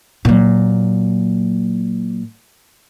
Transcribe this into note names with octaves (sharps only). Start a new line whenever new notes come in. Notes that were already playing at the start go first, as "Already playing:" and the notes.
A#2 F#3